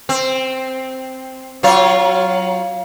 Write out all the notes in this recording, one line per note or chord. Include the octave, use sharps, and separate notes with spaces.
C4
F#3 F4 C#5